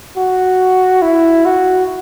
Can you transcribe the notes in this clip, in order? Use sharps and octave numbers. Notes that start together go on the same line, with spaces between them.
F#4
E4
F#4